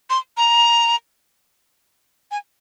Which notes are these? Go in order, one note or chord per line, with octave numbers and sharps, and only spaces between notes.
C6
A#5
G#5